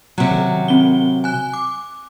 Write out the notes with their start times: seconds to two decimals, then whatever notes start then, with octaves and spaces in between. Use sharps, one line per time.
0.18 C3 F#3
0.31 D#3
0.68 C4 G7
1.24 G#5 F#6
1.53 D6